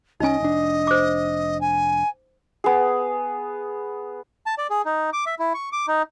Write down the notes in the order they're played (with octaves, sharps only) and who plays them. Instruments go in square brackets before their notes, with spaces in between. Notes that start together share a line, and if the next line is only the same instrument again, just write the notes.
[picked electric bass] C2 C#4 [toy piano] D#4 G#5 [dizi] D#5
[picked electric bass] F1 D4
[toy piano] C5 D6
[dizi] G#5
[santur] B3 G#4
[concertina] A5
D5
G#4
D#4
D6
E5
E4
C#6
D6
D#4